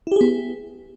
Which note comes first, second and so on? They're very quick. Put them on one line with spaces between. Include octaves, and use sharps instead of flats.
E4 G4 G#4 B3